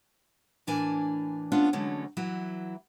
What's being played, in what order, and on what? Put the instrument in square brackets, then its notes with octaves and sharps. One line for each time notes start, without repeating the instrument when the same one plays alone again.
[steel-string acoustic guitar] A2 E3 D4 A#4 G#5 A5
A3 B3 C#4 D4 F4
D3 E3 F#3 G#3 A3 C#4
E3 F#3 E4